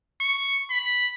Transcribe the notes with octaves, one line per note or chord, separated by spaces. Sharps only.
C#6
B5